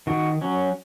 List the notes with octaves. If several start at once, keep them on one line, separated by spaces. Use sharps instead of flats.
D#3 F#4
F#3 C#4